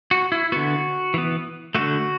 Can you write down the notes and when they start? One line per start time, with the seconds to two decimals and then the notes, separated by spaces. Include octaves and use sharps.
0.11 F#4
0.32 E4
0.52 D3 B3 F#4
1.14 E3 B3
1.75 D3 A3 F#4